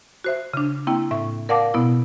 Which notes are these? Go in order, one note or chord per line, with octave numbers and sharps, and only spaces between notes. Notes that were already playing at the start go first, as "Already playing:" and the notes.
F#4 C5 E5
C#3 D4
A#3 C4 E4 G5
A2 E5 C#6
A#4 D5 F5 F#5 A5 D6
B2 B3 E4